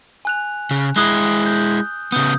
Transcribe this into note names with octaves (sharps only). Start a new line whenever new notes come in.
G#5 F#6 F7
C#3
G#3 E4 D#6 F#6 G7
G6
C#3 B3 D#6 G6